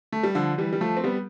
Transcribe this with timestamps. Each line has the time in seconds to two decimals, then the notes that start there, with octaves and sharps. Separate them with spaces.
0.13 A3
0.23 G3
0.35 D3 F3
0.58 E3 G3
0.73 G3
0.81 F3 A3
0.97 C4
1.04 G3 B3